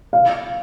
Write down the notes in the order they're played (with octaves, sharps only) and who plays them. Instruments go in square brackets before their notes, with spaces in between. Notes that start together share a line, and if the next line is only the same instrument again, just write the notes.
[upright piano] F5